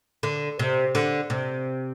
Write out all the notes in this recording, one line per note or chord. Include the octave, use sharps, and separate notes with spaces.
D3
C3
D3
C3